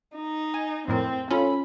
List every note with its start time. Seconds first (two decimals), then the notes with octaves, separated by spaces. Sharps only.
0.14 D#4
0.54 G#5
0.88 F2 A2 C4 A#4
1.31 C#4 F4 A4 B5